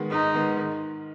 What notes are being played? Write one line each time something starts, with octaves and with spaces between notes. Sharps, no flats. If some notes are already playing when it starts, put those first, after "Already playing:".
Already playing: D#3 G#3 B3
G#2 D#4
D#3 G#3 B3
D#3